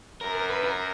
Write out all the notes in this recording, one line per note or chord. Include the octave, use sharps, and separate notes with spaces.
F#2 A#4
A#4
B4
A#4